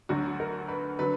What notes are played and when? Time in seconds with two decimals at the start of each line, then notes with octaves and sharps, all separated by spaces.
0.09 D2 D3 F#3 F#4
0.40 A#4
0.68 B4
0.99 D3 F#3 B4